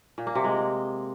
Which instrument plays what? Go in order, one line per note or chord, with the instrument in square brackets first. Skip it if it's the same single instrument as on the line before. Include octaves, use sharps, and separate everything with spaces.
[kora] A#2
A#3
C3
G#3